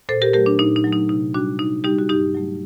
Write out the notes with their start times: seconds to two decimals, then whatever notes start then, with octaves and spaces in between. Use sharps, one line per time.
0.09 A#2 A4 C5
0.22 G4 A#4
0.33 F#3 A3 G4 A#4
0.46 D4
0.59 A#2 D#4
0.76 D#4
0.84 F#3 A3
0.93 D#4
1.09 C3 D#4
1.34 G3 D4 F#4
1.59 C3 D#4
1.84 G3 D#4 G4
1.99 F#4
2.09 G2 D#4 G4
2.34 F#3 A3